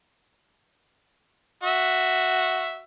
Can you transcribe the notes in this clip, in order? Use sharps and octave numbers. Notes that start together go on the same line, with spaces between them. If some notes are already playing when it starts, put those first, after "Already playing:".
F#4 E5